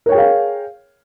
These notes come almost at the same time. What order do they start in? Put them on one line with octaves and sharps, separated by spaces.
A#4 C#5 G5 G#4 F5